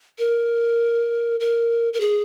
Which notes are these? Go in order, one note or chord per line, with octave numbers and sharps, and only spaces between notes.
A#4
A#4
A#4
G#4